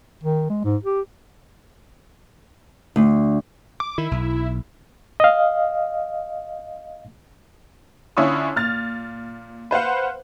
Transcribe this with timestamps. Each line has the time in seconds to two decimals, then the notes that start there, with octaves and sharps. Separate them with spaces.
0.24 D#3
0.50 G#3
0.65 G#2
0.84 G4
2.96 D2
3.80 D6
3.98 D#3 E4
4.11 B1
5.20 D#5 F5
8.17 D3 C#4 E4 F4 C#6 D#6
8.56 A#2 F6 A6
9.71 B4 C5 F5 F#5